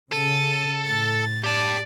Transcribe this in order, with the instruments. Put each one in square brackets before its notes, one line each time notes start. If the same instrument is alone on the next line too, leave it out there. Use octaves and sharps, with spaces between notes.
[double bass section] C#3 [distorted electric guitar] A4 [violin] D#7
[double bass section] A2 [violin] A6
[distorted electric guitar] G4 A5 [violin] D5